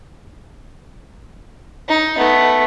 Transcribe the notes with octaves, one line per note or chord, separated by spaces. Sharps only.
D#4
A3 B3